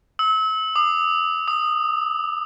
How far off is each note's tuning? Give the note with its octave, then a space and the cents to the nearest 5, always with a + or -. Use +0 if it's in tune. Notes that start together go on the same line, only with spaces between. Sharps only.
E6 -35
D6 +45
D#6 -20